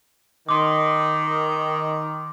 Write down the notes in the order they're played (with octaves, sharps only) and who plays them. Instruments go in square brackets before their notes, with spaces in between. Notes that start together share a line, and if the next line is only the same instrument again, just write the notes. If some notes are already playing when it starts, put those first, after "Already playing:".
[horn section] D#3 [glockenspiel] C6 D6